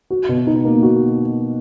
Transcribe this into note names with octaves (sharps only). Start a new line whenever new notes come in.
F#4
B2
D#4
A#3
F#4